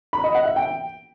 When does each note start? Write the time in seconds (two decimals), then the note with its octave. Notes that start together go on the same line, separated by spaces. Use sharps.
0.13 B5
0.24 D#5
0.35 F#5
0.45 E5
0.56 G5